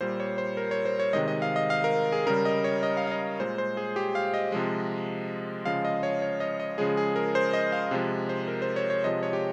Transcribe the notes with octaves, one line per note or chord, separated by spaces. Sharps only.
A#2 G3 C5
C#5
C5
A#4
C#5
C5
C#5
C3 D#3 G#3 D#5
D#5
F5
D#5
F5
A#4
G#4
C#3 G3 A#4
D#5
C#5
D#5
F5
F5
D#5
A#2 G#3 C5
C5
G#4
G4
F5
D#5
C3 F3 G#3
C#3 F3 G#3 F5
D#5
C#5
C#5
D#5
D#5
C#3 F3 G#3 G#4
G#4
A#4
C5
D#5
F5
C3 F3 G#3
C5
A#4
C5
C#5
C#5
C3 F3 G#3 D#5
C#5
G4